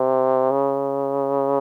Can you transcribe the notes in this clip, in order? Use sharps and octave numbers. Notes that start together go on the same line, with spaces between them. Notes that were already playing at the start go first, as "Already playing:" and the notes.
Already playing: C3
C#3